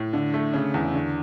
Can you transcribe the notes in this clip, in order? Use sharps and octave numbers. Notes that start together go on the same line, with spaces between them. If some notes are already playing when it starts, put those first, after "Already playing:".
Already playing: A2
D3
A3
C#3
E2
D3